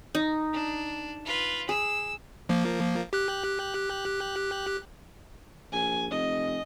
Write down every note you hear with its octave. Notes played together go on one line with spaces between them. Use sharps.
D#4
D4
F4 B4
G#4 E6
F3 A#3
G4 F#6
A#1 G#5
F1 D#5